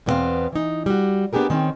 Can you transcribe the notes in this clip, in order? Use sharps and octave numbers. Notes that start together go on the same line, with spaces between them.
E2 B2 F3 B3 C4 F5
E3 D#4
G3 F#4
B3 D4 G4 G#4 A#4
D#3 C4 C#4